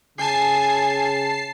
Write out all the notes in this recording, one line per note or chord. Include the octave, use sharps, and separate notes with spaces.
C#3 G#5 A5 C7